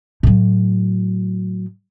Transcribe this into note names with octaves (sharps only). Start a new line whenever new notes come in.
A2 F#3